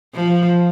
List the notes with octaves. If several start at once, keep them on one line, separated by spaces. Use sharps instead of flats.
F3